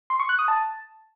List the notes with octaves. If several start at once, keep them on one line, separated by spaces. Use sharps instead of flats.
C6
C#6
F#6
D#6
A5